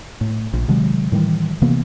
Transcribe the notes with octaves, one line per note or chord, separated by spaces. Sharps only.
A2
A#1
C3 D#3 F#3 G#3
A2 D#3 E3 G3
C3 E3 A#3 B3